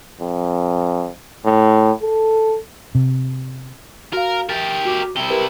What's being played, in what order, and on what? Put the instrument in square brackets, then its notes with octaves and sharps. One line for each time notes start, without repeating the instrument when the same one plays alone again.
[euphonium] F2
A2
A4
[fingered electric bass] C3
[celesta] F#4 F5 [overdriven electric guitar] A#4
[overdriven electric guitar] G4 A#4 [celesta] E5 A6
[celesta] F#4 D6
[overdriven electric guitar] C3 E4 [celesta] G7
[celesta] G4 A#4 B4